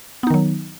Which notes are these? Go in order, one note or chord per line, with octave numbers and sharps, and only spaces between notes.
D#3 F#3 B3 D#4